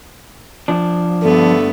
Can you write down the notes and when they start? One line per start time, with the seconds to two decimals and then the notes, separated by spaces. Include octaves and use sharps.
0.68 F3 D4
1.22 G2 D3 A3 B3 A4